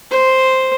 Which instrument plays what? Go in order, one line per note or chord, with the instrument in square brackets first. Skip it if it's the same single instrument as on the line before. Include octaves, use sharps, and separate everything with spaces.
[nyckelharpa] C5